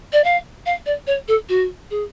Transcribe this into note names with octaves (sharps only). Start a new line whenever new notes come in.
D5
F5
F5
D5
C#5
A4
F#4
G#4